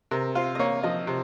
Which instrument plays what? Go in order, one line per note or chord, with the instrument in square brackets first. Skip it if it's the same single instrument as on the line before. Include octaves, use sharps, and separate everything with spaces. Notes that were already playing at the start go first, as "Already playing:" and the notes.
[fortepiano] C3 [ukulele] A#4
[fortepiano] F4 [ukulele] C5
[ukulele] D#5
[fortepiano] A#3 [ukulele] C#5
[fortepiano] F3 [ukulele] D#5
[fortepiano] C3